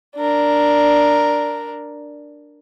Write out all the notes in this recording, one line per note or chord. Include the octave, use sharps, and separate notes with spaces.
D4 A#4